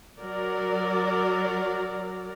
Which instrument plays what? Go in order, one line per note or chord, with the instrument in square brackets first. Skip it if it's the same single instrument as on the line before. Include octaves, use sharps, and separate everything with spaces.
[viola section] F#3 A#4 D5